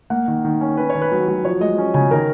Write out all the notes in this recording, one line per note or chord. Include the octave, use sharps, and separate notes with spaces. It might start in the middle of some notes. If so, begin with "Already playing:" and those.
A#3 F#5
D#3
D#3
C#4
C#4 B4
C#5
D#3
B4
F#3
F#3
F3 C#5
G#3 D#5
C#4
C#3 G#5
D#3 A#4